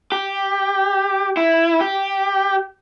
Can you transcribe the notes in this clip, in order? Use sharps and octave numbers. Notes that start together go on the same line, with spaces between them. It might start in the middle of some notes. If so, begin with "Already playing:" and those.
G4
E4
G4